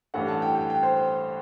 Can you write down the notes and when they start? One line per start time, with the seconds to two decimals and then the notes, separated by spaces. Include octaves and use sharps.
0.14 A1 G2 E3 A3 F#5
0.28 A5
0.42 G5
0.55 G5
0.70 G5
0.83 C5